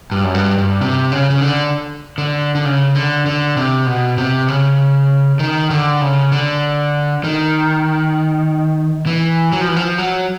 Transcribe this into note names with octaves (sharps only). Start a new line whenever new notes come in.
G2
F#2
G2
G2
C3
C#3
C#3
D3
D3
D3
C#3
D3
D3
C3
B2
C3
C#3
D#3
D3
C#3
D3
D#3
E3
F#3
F3
E3
F3
F#3